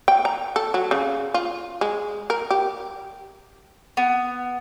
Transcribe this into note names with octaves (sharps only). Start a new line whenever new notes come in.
G5
A#5
A4
F#3
C#3
F4
G#3
A#4
G4
B3